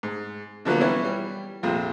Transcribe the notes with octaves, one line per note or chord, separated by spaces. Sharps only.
G#2
B2 D3 F3 F#3 A3 A#3
E3 G3 B3 C#4 E4
G3
A#1 F2 C3 F4